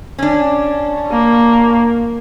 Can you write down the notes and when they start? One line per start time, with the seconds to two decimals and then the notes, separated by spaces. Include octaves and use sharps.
0.18 C#4 D4
1.12 A#3